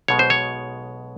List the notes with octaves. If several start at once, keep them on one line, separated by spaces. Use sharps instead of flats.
B1 B2 G#3 C#5
C5
C#5